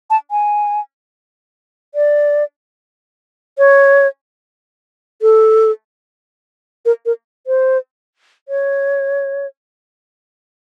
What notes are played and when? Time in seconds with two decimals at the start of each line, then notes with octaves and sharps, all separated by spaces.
0.10 A5
0.31 G#5
1.95 D5
3.58 C#5
5.22 A4
6.85 A#4
7.06 A#4
7.47 C5
8.48 C#5